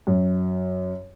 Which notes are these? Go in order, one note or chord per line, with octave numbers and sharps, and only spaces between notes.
F#2